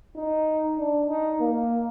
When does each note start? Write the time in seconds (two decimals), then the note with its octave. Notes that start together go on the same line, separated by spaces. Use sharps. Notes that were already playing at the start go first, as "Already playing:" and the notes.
0.16 D#4
0.78 D4
1.09 D#4
1.40 A#3